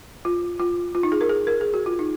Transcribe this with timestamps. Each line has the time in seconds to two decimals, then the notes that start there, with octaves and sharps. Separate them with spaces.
0.25 F4
0.60 F4
0.95 F4
1.03 D#4
1.12 G#4
1.21 A#4
1.29 G#4
1.47 A#4
1.61 G#4
1.74 F#4
1.86 F4
1.99 D#4